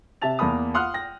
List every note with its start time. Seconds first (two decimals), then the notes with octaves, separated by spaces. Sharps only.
0.22 C3 E5 A5 A6 F7
0.39 E2 A#3 A5 B5 D#6
0.74 F5 F#5 C6 D#6 F6 F#6
0.94 G5 A#6